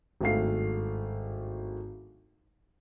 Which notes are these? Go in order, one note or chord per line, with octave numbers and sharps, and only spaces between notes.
G#1 G2 A3 F5 C7